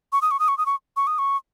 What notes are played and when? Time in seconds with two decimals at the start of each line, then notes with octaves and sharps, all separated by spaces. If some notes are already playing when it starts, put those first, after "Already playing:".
0.12 C#6
0.22 D#6
0.31 C#6
0.40 D#6
0.48 C#6
0.58 D#6
0.66 C#6
0.97 C#6
1.07 D#6
1.18 C#6